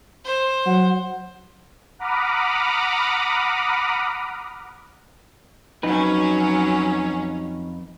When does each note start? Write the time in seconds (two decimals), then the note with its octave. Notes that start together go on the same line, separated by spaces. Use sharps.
0.25 C5
0.66 F#3 F#5
1.99 F#5 A#5 B5 D6 D#6 F6
5.83 F2 F#3 C#4 D#4 B4